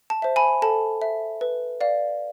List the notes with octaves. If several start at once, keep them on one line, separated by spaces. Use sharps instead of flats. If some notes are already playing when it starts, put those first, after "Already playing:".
A5
C5 E5
G#5 B5
A4 A5
E5
B4
D5 F5